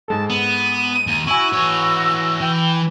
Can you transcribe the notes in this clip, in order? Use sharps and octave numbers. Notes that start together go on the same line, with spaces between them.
G#2 G#3 A4 A5
B3 D#7
D#2
E4 F#4 G#5 C#6 E6
E3 C#5
E3 G5